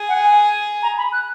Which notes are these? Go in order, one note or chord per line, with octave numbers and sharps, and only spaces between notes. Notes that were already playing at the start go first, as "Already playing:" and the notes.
Already playing: G#4
F#5
G#5
A#5
B5
F#6